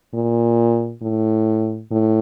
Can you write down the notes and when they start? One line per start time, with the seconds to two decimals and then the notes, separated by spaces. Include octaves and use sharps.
0.14 A#2
1.02 A2
1.91 A2